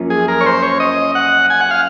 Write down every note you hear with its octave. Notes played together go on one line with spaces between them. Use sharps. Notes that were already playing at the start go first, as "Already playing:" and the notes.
Already playing: F#2 F3 A#3 C#4 F4
G#4
A#4
C#5
C5
C#5
D#5
F#5
G#5
F#5
F5